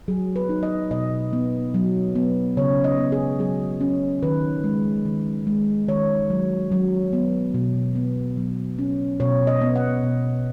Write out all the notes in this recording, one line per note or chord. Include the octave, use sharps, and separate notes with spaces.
F#3 G#4
B4
D#4
D#5
B2 D#5
B3
F#3
B3
C#3 C#5
D#5
B3
G#4
F#3 G#4
C#4
D#3 B4
G#3
D#3
G#3
D#3 C#5
F#3
F#3
B3
B2
B3
F#3
C#4
B2 C#5
D#5
B3
F#5
B2